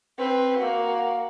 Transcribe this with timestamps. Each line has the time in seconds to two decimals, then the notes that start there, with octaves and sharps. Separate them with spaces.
0.18 C4 B4
0.58 A#3 F#4